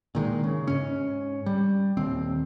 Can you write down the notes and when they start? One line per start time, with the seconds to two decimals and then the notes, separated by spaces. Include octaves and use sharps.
0.15 A#2 D#3 G3 G#3
0.44 C#3
0.67 G#2 C#4
1.46 G3
1.97 D#1 D#2 C4